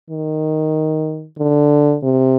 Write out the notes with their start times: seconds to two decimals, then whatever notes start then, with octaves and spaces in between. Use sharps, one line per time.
0.10 D#3
1.39 D3
2.03 C3